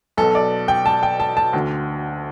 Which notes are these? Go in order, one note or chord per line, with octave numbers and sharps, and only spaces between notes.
B1 B2 A4
D5
G5
A5
G5
A5
A5
D2 D3